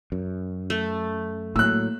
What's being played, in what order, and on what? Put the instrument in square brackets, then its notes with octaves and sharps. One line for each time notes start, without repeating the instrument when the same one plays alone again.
[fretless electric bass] F#2
[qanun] A3
[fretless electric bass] A2 F#3 [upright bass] A#3 [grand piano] E6 F#6